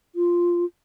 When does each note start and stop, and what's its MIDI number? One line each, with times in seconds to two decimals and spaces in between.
0.16 0.65 65